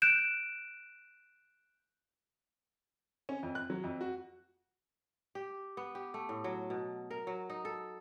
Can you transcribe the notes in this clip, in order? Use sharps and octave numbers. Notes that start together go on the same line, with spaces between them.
F#6 G6 D7 E7
C#4
F2
F#6
F#3
F2
F#4
G4
B3
G4
A3
A2
F#3
B2
A#4
F#3
D#4
A4